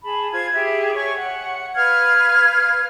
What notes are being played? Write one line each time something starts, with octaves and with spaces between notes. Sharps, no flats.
G#4 A5 B5
F4 C5 G#6
G4 G#4 E5
C#5 G#5 C#6
F#5
B4 F5 F6 G#6